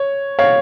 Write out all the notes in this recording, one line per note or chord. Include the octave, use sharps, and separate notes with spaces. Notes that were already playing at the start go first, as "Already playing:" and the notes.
Already playing: C#5
C#5 F5